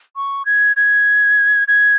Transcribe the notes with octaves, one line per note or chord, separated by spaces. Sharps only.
C#6
G#6
G#6
G#6